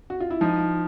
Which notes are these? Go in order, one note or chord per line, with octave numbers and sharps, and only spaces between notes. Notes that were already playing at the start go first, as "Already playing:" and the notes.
F#4
F4
E4
F3 D#4